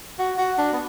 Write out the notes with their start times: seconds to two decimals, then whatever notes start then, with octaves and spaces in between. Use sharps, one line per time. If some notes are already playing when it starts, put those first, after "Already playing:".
0.19 F#4
0.38 F#4
0.58 D4
0.73 B3